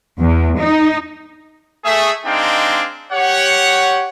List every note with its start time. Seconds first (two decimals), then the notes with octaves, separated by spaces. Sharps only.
0.20 E2
0.59 D#4
1.84 A3 G#4 E5
2.26 G#3 C4 D4 D#4 F5 G5
3.13 G4 C#5 F#5